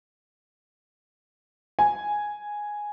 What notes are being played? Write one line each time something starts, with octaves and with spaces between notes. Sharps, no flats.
G#5